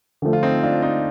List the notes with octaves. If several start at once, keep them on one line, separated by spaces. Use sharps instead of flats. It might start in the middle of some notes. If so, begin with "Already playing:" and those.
D3 F3 A3
F4
C4 D#4
D4 F4
C4 D#4